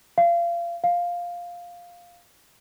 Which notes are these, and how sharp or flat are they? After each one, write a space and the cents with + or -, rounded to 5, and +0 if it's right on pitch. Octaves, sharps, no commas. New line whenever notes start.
F5 -30
F5 +5